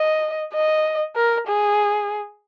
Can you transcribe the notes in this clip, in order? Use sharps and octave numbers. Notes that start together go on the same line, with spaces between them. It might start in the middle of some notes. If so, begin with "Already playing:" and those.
Already playing: D#5
D#5
A#4
G#4